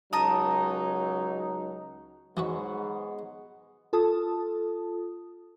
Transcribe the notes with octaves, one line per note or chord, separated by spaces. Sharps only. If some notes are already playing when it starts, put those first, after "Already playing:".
C#2 F#3 D#4 A#4 A5 D#6
G#2 E3 G#3 B3 F#4 B4 C#5 F#5
F4 A4 A5 D#6